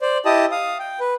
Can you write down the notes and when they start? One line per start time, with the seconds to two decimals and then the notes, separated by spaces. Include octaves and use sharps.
0.01 C5 D5
0.25 E4 G4 D#5 A5 D#6
0.51 F5 D#6
0.79 G5
1.00 B4